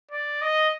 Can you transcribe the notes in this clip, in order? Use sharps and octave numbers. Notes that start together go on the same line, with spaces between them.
D5
D#5